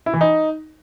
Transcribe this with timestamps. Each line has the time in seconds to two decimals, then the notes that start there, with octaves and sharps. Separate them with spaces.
0.06 E4
0.14 E3
0.21 D#4